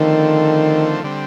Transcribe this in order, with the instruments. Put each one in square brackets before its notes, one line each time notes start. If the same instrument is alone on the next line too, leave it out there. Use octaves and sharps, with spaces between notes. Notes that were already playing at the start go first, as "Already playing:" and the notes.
Already playing: [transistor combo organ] D3 F3 A3 C4 [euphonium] D#3
[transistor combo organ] D3 G3 C4